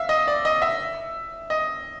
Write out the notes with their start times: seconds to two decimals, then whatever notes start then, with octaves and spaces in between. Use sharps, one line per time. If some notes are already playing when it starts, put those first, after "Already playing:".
Already playing: E5 F5
0.09 D#5
0.28 D5
0.45 D#5
0.62 E5
1.50 D#5